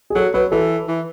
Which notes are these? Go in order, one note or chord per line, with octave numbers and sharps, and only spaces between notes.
G#4
F#3 A4
F#3 B4
E3 A4
E3